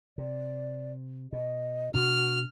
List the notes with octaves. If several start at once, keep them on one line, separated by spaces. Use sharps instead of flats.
C3 D5
B2 D#5
B2 D4 F#4 F6